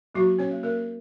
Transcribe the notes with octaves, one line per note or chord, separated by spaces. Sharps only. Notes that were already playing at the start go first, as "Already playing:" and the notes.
F#3 A#3 F#4
C#4 C#5
A#3
A#3 A#4